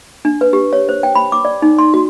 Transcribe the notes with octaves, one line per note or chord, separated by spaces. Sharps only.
D4
B4
G4
C#5
C5
G5
B5
D6
D5
D#4
C6
F#4